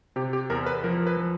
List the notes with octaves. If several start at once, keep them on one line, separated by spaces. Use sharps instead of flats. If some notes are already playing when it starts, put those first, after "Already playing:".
C3 G4
G4
E2 A#4
B4
F3 A#4
B4
F3